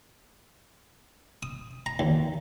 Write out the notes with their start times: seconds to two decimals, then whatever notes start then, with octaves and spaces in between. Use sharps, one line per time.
1.43 D#6
1.86 A#5
1.99 D#2